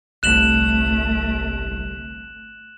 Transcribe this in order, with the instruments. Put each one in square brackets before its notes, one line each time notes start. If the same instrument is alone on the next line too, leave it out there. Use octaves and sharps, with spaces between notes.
[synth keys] G1 C2 [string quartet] A3 [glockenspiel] F#6 E7 F#7